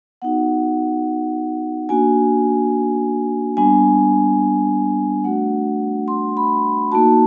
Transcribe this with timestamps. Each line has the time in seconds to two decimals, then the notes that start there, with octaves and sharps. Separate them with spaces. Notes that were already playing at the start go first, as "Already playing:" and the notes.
0.22 B3 D#4 F#4 F#5
1.89 A#3 D4 F#4 G#5
3.57 G3 B3 D4 G#5
5.24 A3 D4 F#4 F#5
6.08 C6
6.37 B5
6.92 A#3 D#4 F#4 A5